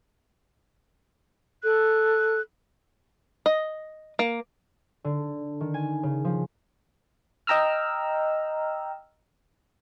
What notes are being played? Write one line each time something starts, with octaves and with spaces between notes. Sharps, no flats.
A4 F#6
D#5
A#3
D3
D#3
G#5
C#3
F3
D#5 G5 A#5 E6 F6